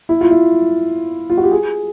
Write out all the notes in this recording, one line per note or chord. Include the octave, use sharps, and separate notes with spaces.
E4
F4
E4
F4
F#4
G4
G#4